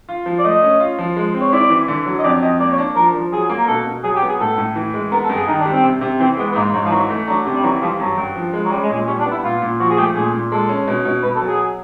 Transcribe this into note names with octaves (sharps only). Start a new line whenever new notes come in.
F4
F3
D5
A3 D#5
C#4
F4
F3
G#3
C4
C#5
E4 D5
E3
D3
F#3
D#5
F2 D5
F2 D#5
A#3 D5
C#5
D4
F3 A#4
F3
F#3 G#4
A#3
A#4
B2 A4
B2
F#3 G#4
G4
B3
G#4
A2 A4
A2
E3
G#3
B3 A#4
A4
G2
G#4
D#3 D#4
D4
G3
C4
C3
C3
E3 C4
G#3 B3
B3
G#2 A#3
G#2 F#3
F3
E3 F#3
A3
F#3 D4
C3
G3
E3 F#3
F3 G3
G2 F#3
G2
F3
G#3
F#3
G3 C#4
G#3
A#2
G#3
G3 C#4
D4
B3
E4
A#2 F4
A#2
F3 F#4
G#4
A3 G4
A#2 G#4
A#2
G#3 A4
C#4
B2
B2
B2 B4
A4
F#3
G#4